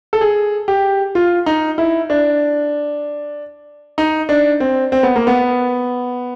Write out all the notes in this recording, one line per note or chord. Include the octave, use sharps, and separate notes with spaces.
A4
G#4
G4
F4
D#4
E4
D4
D#4
D4
C4
C4
B3
A#3
B3